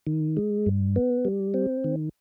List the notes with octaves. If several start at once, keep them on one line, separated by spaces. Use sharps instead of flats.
D#3
G#3
G2
B3
G3
C4
D#3